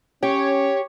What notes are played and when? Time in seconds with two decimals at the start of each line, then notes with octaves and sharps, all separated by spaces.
0.23 C#4 G4 C#5